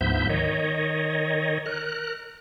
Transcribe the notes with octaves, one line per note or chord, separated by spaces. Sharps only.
D2 G#2 F3 B3 E5 G6
D#3 C#5 D#5
A#4 F#6